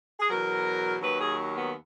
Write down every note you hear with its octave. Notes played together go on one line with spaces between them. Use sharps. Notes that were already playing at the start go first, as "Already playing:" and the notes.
G#4
E2 B2 F#3 A#4
D#2 D#3 F#3 B4
G#4
B3